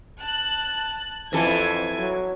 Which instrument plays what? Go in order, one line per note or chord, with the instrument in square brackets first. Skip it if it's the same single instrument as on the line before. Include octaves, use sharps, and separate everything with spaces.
[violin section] A5 F#6
[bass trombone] F2 [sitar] E3 A4 [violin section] G#6
[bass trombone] F#3